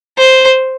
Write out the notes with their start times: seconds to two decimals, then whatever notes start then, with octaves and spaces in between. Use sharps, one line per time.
0.18 C5